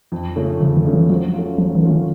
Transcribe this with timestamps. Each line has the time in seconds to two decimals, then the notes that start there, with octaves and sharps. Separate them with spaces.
0.12 F2
0.36 C#3 F3 A3 C#4
0.61 F2 C#3
0.77 D3
0.85 C#3 F3 A3 C#4
0.93 E3
1.09 F3 F#3
1.34 A3 C#4 F4
1.58 F3 F#3
1.75 E3
1.83 A3 C#4 F4
1.91 D#3